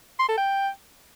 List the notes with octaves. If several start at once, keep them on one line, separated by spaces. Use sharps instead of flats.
C6
A4
G5